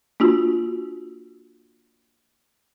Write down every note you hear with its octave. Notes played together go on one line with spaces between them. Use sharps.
A#3 D4 F4 F#4